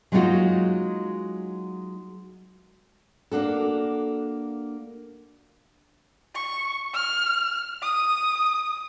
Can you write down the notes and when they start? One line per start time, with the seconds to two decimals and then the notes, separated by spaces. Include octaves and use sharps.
0.12 F#3 G#3 A#3 D#4 F4 F#4
3.32 A#3 D4 F#4 A4
6.35 C#6
6.94 F6
7.82 D#6